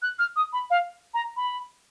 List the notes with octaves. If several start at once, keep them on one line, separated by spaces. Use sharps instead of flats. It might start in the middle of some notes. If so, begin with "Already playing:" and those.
F#6
F6
D#6
B5
F5
A#5
B5